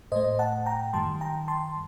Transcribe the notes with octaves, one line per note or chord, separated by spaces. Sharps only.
A2 A3 C5 D#5
F#5 A5
G5 A#5
F#2 D#3 G3 A5 C6
G5 A#5
A5 C6